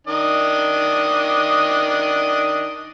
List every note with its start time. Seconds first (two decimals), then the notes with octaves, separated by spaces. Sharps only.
0.07 D#3 D4 D#5